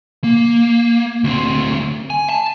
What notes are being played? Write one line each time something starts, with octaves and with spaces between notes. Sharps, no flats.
A#3
D2 C4
G#5
A5